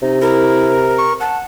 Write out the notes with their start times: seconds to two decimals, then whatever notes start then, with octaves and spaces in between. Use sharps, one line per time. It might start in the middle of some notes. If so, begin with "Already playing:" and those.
0.02 C3 D#4
0.21 E4 A#4
0.98 C#6
1.20 F#5 A5